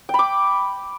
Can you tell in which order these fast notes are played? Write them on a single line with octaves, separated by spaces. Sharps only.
G5 B5 D6